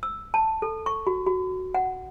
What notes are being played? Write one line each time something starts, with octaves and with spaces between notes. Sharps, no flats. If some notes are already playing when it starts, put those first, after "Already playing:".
E6
A5
A4
C#6
F#4
F#4
F#5